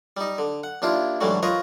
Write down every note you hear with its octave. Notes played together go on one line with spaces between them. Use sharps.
G3 D#4
D3
F#5
D#2 D4 E4 F4
G#2 D3 E3 F#3 G3 A3
F4 A#4 B4 C#5 D#5